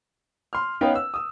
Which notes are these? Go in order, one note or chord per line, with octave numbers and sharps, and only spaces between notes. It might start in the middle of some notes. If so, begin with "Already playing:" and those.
C6 F6
B3 C#4 D#4 B4 F5 G5
E6
D#6 E6